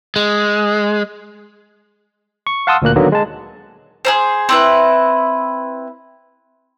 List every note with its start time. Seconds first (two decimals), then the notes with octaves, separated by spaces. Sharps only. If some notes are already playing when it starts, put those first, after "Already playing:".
0.16 G#3
2.47 C#6
2.67 F5 F#5 A5 C6 D#6 E6
2.82 D2 A#2 A#3 F#6
2.96 D3 D#3 F#3 A#3 B3
3.12 G#3 A5
4.05 G#4 A#4 C5
4.49 C4 E4 B4